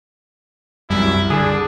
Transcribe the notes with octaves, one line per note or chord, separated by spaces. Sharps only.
C2 F#2 E4
D3 D4 G#4